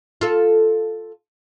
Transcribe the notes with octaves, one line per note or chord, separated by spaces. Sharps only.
F4 A4